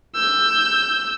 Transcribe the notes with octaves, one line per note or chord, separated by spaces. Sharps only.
E6 G6